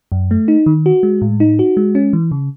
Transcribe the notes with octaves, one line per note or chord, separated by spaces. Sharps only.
F#2
A3
D#4
D#3
F#4
G#3
A2
D#4
F#4
G#3
C#4
E3
C#3